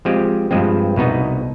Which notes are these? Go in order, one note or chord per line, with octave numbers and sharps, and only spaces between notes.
F3 G#3 C4 G4
G2 F3 G#3 C4
C2 B2 B3 D#4